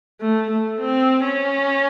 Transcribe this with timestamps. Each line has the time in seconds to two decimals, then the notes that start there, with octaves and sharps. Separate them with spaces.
0.20 A3
0.50 A3
0.80 C4
1.24 C#4